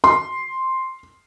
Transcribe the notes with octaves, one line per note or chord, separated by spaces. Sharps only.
C6